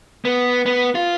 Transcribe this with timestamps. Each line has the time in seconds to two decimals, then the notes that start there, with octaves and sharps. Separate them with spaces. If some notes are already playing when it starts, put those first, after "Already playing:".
0.25 B3
0.66 B3
0.95 F4